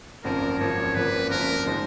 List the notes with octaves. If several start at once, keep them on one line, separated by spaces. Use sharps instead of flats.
G#1 F#2 F3 A#3 A#4
G#1 F#2 F3 A#3 C#5
G#1 F#2 F3 A#3 B4
G#1 F#2 F3 A#3 A#4
F3 G#3 D#4